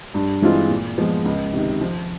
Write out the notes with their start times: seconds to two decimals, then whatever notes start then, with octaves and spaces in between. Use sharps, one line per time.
0.14 G2
0.42 E3 G#3 C4 F4
0.70 A#2
0.98 F3 G#3 B3
1.25 C#2
1.53 C3 D#3
1.81 F3